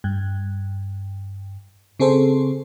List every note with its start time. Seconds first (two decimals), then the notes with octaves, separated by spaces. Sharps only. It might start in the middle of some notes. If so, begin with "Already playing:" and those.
0.04 G2
1.99 C#3 C4 G#4 A4 C5